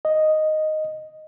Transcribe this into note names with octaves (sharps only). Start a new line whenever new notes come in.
D#5